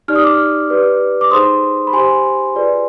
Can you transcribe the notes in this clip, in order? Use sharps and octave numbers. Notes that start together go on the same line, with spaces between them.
D#4 G4 D5 F6
D#6
D6 F6
G4 B4 D5
D6
D#4 G#4 C5 C6 D#6
B5
G4 C5 G#5 C6
F4 G#4 B4 D5